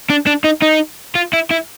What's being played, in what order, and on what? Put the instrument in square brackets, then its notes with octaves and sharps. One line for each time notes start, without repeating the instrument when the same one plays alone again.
[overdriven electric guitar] D4
D4
D#4
D#4
F4
E4
E4